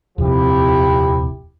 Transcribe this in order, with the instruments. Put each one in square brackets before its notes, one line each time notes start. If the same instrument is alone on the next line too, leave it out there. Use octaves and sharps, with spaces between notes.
[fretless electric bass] D#1 F2 C3 [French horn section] F3 E4 G4